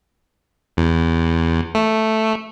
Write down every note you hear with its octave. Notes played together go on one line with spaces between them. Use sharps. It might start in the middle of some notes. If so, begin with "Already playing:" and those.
E2
A3